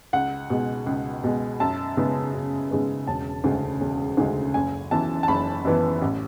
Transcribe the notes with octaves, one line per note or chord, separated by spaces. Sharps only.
C#2 F#5
B2 G#3
C#2
B2 G#3
F#2 A5
C#3 G#3 B3
F#2
C#3 G#3 B3
E1 A5
D2 C#3 G#3
E1
D2 C#3 G#3
F#1 G#5
F#2 E3 B3 A5
A5
F#1 B5
F#2 E3 B3
A1